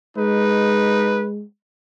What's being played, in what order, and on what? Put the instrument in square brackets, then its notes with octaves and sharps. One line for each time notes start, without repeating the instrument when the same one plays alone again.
[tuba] G#3 [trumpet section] D#4 B4